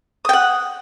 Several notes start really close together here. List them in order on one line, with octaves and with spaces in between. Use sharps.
D#6 G5 F#5